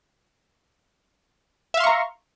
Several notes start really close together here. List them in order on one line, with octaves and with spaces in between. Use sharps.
E5 F5 C6 C#6 A#5